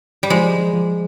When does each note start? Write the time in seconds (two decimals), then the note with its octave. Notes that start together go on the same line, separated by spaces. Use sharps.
0.23 G3
0.30 F3 G#3
0.73 F3